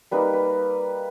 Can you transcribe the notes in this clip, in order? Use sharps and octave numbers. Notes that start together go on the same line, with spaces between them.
G3 A#3 D#4 B4
B4